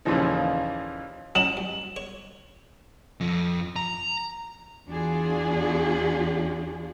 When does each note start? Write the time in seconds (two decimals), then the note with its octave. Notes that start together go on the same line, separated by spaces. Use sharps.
0.05 D#2 A#2 C#3 E3 F3 D#4
1.35 F#3 C#4 D#4 E7 F#7
1.57 G2
1.96 C#5
3.21 F2
3.76 A#5
4.87 E2 E3 D4 F4 F#4 G#4